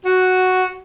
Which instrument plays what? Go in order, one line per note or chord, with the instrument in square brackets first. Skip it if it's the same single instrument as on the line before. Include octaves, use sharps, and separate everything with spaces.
[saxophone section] F#4